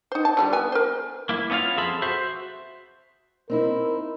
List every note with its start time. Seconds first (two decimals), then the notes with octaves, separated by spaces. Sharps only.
0.12 D#4 C5
0.25 A5
0.37 D3 G3 F4
0.53 B3 G#5
0.72 A#4 C5
1.29 A#3 E4
1.50 B3 C#4 D#4 F4 F5
1.77 F2 G#4 A4 C5 E5 B5
2.02 F#4 C5 E5
3.50 C4 D#4 E4 A#4